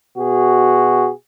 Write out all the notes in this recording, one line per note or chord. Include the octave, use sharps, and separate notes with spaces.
B2 F#4 G#4